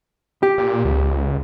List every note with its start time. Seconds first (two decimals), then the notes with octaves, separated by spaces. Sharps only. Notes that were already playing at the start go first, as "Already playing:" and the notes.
0.43 G4
0.58 A#2
0.85 C#2